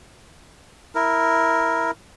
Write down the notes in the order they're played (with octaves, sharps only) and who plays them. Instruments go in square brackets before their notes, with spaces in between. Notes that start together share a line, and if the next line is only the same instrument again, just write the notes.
[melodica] E4 A#4